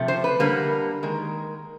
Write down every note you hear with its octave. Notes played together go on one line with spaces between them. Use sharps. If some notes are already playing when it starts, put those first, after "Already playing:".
Already playing: C3 F3 A3
C5
B4
D3 G3 A#3
D#3 G#3 A#4